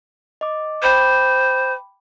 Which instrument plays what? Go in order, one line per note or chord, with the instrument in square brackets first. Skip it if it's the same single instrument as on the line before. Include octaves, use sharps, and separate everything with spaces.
[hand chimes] D#5 D6
[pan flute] C5 [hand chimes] G5 B5 D6